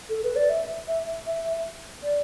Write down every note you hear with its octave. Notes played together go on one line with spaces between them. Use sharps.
A4
B4
D5
E5
E5
E5
D5